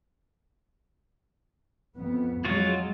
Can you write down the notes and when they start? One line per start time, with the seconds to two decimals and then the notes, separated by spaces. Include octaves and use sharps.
1.97 F2 B3
2.45 F#3 G#3 F4 F#4